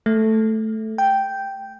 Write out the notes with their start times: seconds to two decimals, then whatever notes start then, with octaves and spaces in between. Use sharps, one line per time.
0.06 A3
0.98 G5